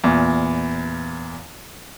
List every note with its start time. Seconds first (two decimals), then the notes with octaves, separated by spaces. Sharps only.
0.04 E2 A#2